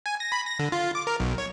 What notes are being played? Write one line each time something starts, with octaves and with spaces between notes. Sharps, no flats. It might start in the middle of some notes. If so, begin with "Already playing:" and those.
G#5
A#6
B5
A#6
D3
F4
D6
A#4
B1
C#5